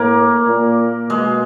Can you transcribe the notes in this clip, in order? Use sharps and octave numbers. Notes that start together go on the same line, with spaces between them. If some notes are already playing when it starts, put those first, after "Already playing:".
Already playing: A2 A#3
A#2
B2 G#3